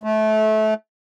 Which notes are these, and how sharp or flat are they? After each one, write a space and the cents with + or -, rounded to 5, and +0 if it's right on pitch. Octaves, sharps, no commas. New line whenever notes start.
A3 -25